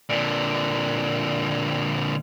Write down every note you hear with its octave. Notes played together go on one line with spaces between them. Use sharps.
A#2 D3